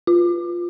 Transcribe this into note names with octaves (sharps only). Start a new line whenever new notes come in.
F4